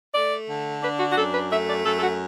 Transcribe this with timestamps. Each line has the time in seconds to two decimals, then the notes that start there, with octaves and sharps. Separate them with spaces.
0.15 A3 D5
0.49 D3
0.82 D4 B4
0.99 F#4
1.12 F#4
1.17 F#2 A4
1.34 B4
1.50 A3 E5
1.67 D5
1.85 F#2 A4
1.96 A4
2.02 F#4